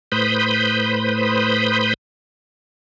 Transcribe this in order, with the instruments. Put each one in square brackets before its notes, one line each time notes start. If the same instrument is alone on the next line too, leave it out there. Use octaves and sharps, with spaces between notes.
[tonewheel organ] A2 B4 C5 B5 D#6 G6